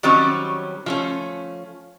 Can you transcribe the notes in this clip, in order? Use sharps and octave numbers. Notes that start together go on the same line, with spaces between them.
D#3 F#3 G3 C4 C#4
F3 A3 C#4